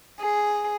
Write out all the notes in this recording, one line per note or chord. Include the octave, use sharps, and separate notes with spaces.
G#4